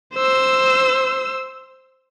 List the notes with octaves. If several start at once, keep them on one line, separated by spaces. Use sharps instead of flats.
C5 E6